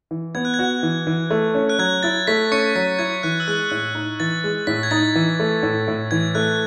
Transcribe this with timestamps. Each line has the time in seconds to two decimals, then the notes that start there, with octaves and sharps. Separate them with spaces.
0.11 E3
0.35 B3 G#6
0.45 F#6
0.54 G#6
0.59 F#4
0.83 E3
1.07 E3
1.30 A3
1.55 C#4
1.69 F#6
1.79 F#3 G#6
2.03 E4 A6
2.27 A3 B6
2.51 C#4 C#6 C#7
2.75 F#3 B6
2.99 E4 G#6
3.23 E3 F#6
3.40 E6
3.47 G#3 F#6
3.71 A2 F#6
3.95 D#4
4.20 E3 A6
4.44 G#3
4.67 A2 B6
4.83 G#6
4.91 D#4 A6
5.15 E3
5.40 A3
5.63 A2
5.88 A2
6.11 E3 G#6
6.35 A3 F#6